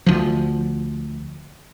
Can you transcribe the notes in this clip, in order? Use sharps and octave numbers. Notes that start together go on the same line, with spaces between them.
D2 F3